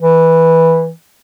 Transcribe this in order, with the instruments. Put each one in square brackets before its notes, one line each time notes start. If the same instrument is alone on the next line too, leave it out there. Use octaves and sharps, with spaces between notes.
[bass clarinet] E3